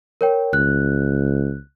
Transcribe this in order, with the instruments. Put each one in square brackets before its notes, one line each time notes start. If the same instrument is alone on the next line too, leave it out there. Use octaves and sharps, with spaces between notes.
[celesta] A#4 C#5 G5
[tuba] C#2 [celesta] F#6